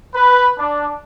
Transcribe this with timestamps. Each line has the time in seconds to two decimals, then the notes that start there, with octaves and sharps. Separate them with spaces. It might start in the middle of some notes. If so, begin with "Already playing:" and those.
0.13 B4
0.57 D4